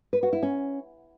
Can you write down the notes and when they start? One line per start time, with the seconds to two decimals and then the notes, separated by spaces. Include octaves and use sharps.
0.13 B4
0.23 F#4
0.33 E4
0.43 C#4